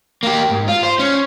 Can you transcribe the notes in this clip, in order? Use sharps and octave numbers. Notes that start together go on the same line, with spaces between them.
A#3 G4
G#2
F4
C5
C#4